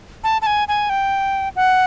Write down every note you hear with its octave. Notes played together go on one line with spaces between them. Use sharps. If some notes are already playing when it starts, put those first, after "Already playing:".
A5
A5
G#5
G#5
G5
F#5